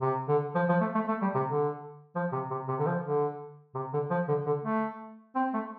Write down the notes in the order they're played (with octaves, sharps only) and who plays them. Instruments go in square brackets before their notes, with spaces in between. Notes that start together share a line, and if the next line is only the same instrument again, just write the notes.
[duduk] C3
D3
F3
F3
A3
A3
A3
G3
C3
D3
F3
C3
C3
C3
D3
F3
D3
C3
D3
F3
D3
D3
A3
C4
A3